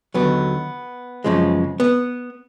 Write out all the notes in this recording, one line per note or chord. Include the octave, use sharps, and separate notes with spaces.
D#2 D3 F#3 B3
F#2 C#3 F3 G#3
B3